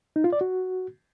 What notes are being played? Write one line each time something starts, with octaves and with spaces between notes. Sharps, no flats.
D#4
F4
D5
F#4